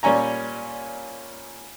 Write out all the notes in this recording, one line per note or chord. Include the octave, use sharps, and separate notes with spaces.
A#2 G3 C#4 G#5 A#5